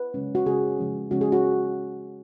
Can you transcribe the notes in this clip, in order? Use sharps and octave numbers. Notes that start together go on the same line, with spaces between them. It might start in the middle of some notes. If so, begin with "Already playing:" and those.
Already playing: B4
C#3 G#3 C#4
F#4
C#3 G#3 C#4 G#4
C#3 F3 G#3 C#4
C#3 F3 G#3 C#4 F#4
G#4
F#4